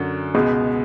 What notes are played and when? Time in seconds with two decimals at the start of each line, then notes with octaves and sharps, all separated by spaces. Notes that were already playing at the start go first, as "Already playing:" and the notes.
Already playing: F#2 D3 F#3
0.34 C#2 B2 G#3